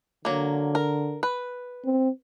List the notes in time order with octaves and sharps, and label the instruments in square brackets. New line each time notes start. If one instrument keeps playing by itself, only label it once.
[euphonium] D3 [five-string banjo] F#3 A#3
[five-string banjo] A#4
B4
[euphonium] C4